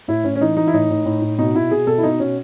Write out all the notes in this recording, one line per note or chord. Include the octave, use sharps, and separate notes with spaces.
A2 E4
A2 C#4
C#4
E3 D#4
E3 D#4
E4
A2 D#4
A2
A2
A2
B2 D#4
B2 E4
B2 G#4
B2 A4
E4
B2 D#4
B2 C#4